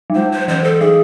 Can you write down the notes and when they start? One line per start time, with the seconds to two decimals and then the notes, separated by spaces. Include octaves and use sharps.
0.10 F#3
0.15 G#3 C5
0.32 C5
0.48 E3 C5
0.64 A4
0.80 F#3 G#4